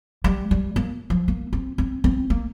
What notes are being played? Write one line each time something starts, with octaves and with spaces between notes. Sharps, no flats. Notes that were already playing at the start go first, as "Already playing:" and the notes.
G3
G3
A#3
F3
A#3
C4
C4
C4
A#3